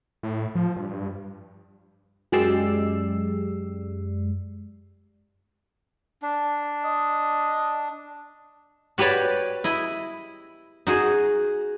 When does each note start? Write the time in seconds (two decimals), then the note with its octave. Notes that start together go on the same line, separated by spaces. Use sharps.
0.23 A2
0.55 F3
0.76 G2
2.32 F#2 G#3 G4 D5 E6 C7
6.22 D4
6.85 D#5
8.98 F#4 G4 B4 C#5 D5
9.64 E4 D#5 B5
10.87 D#4 F#4 G#4